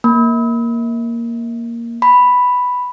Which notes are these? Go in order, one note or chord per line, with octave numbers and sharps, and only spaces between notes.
A#3
B5